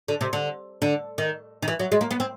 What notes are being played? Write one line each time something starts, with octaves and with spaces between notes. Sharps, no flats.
D3
C3
D3
D3
D#3
D#3
E3
F#3
G#3
A#3
B3
C4